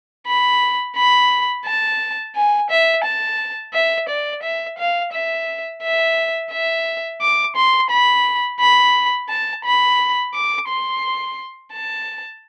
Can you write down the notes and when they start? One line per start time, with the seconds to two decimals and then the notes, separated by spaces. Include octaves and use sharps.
0.27 B5
0.96 B5
1.65 A5
2.35 G#5
2.70 E5
3.04 A5
3.74 E5
4.09 D5
4.43 E5
4.78 F5
5.13 E5
5.83 E5
6.52 E5
7.21 D6
7.56 C6
7.90 B5
8.60 B5
9.29 A5
9.64 B5
10.34 D6
10.68 C6
11.73 A5